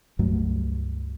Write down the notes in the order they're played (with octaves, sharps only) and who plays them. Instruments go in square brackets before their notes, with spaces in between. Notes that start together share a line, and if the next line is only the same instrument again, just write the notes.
[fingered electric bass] C#2 G2 F#3 A3